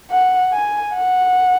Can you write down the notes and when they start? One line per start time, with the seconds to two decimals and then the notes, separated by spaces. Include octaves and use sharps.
0.11 F#5
0.53 G#5
0.94 F#5